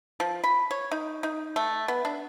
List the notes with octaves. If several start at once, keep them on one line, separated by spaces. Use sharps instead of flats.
F3
B5
C#5
D#4
D#4
A3
B3
D4